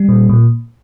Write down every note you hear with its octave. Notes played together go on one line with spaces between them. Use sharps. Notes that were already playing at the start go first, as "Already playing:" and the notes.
Already playing: G3
A#2
A#2